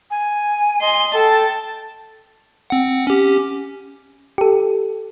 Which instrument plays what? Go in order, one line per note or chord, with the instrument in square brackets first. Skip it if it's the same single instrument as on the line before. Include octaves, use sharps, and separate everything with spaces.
[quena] G#5
[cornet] D#5 [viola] C6
[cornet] A4 [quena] G5 [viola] A5
[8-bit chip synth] C4 F#5
C#4 G4
[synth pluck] G4 A4